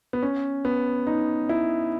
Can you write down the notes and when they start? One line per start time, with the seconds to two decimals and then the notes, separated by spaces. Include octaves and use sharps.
0.13 B3
0.22 C#4
0.65 B3
1.07 D#4
1.49 E4